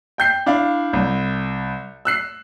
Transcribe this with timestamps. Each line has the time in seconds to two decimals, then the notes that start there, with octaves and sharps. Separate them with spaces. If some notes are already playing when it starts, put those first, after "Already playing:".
0.18 G5 G6 C7
0.46 D4 E4 F5
0.93 C2
2.05 E6 F#6 C7